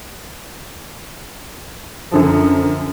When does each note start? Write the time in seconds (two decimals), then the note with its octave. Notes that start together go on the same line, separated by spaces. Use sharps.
2.12 F#2 D3 F3